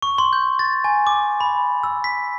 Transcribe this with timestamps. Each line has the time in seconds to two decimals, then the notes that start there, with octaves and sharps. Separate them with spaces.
0.02 C#6
0.18 C6
0.33 G6
0.59 A6
0.84 G#5
1.07 D6
1.41 B5
1.83 E6
2.04 B6